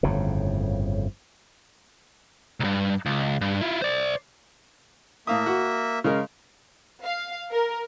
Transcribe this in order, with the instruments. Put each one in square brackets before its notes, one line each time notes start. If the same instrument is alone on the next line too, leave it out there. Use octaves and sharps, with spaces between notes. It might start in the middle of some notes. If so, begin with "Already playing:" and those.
[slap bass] G1 F2 A2 C#3
[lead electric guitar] C2 G2
C#2
G2
E4 F4
C5 D5
[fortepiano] A2 F5 D#6 [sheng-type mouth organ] A#3 E5
[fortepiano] F#4
C#3 G#3 A#4
[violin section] F5
A#4